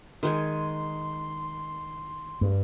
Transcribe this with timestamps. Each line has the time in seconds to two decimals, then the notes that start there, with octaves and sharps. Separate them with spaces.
0.23 D#3 G#3 G#5 C6
2.41 G2